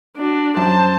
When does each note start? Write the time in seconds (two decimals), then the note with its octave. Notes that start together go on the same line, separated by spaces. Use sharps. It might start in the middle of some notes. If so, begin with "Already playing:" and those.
0.17 D4 F#4
0.57 F#2 C5 A5